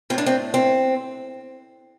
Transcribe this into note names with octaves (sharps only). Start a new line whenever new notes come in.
A2 A3 C4 D4
C4
C4